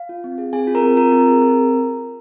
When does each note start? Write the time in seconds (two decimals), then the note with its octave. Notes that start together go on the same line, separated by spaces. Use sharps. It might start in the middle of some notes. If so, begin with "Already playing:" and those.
Already playing: F5
0.09 F4
0.24 C4
0.38 G#4
0.53 C4 G#4 G#5
0.67 F4
0.75 A#4 A#5
0.82 C4
0.97 F4 A#4 A#5
1.12 C4
1.27 G#4
1.41 C4